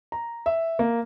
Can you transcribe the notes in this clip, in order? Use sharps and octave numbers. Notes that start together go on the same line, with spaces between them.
A#5
E5
A#3